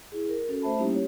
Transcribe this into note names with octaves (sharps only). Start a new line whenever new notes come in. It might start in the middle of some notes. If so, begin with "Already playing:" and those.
E4 G#4
A#4
C#4 F#4 A4
A3 C5 E5 A5 B5
G3 A#3 C#4 D#4 E4 G4
G4 C#5